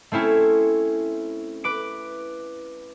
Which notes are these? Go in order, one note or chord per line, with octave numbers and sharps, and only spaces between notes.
A3 C4 C#4 E4
B4 D6 D7